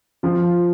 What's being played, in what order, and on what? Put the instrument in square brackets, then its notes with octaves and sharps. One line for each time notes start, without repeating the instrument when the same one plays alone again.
[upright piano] F3 F4